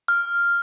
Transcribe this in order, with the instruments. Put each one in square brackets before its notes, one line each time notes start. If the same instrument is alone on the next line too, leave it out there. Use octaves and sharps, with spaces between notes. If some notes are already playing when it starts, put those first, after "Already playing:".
[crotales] F6